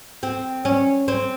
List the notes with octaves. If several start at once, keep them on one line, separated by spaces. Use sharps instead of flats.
C4
C#4
C4